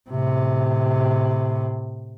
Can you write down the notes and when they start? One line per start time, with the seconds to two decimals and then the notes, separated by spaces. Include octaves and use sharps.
0.10 A2 C3